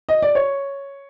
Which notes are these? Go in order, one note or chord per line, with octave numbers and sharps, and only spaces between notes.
D#5
D5
C#5